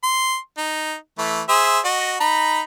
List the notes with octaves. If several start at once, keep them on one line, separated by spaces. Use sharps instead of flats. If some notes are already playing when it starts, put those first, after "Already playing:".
C6
D#4
E3 A3
G#4 C5 E5
F#4 D#5
D#4 A#5 B5